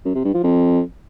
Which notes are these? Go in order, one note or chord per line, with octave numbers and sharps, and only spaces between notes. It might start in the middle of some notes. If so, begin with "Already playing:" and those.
F#2
C3
G2
F3
F2